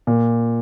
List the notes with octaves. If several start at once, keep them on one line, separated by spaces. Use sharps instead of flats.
A#2